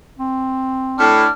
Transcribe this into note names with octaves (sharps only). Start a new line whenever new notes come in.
C4
A2 D4 F6